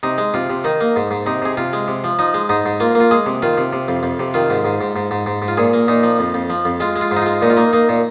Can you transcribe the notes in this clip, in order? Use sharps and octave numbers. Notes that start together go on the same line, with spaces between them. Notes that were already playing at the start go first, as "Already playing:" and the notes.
C3 D#4
G#3
C3 F4
C3
D#3 D#4
A#3
G#2
G#2
C3 D#4
C3 G#4
C3 F4
G#3
C3
F3
F3 D#4
G#3
G#2 D#4
G#2
A#3 F4
A#3
F4
G#3 G#4
C3
D#3 F4
C3
C3
F2
F2
C3
D#3 F4
G#2
G#2
G#2
G#2
G#2
G#2
G#2
F4
A#2 G#4
A#3
A#2 D#4
F3
F2
F2
F3
F2
G#3 F4
G#3
F4
G#2
D#4
G#3 F4
A#2 D#4
F4
A#3 D#4
A#3 D#4
A#2